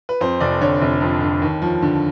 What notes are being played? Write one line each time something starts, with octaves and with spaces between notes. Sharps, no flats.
B4
F2 C5
F1 D5
D3 C#5
F1
F2
D3
D#2
F3
D3